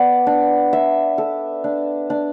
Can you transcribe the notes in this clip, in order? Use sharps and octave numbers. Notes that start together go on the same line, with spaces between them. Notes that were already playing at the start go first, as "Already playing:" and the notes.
Already playing: B3 D5
D4
E5
A4
D4
D4